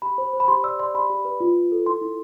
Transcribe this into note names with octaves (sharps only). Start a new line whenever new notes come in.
G4 B5
C5
C5
B5
G4 C6
D5 E6
D5 C6
G4 B5
G4
B4
F4
F4
A4
E4 C6
E4